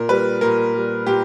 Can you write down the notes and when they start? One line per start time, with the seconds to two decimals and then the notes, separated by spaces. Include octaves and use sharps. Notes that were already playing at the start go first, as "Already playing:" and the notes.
Already playing: A#2 A#4
0.09 G3 B4
0.41 A#2 A#4
0.74 G3
1.07 A#2 G4